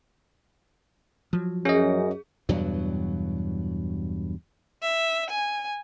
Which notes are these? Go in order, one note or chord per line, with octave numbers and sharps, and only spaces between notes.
F3 F#3
F#2 C#4 G#4 D#5
E2 G2 B2 F#3
E5
G#5